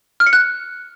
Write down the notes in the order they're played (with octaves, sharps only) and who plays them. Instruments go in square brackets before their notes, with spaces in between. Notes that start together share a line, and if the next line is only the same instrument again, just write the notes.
[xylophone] F6
C#7
F#6